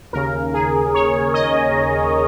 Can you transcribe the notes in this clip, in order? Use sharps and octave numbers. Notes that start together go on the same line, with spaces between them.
D#2 C#3 A#4
G#4
C#5
D#5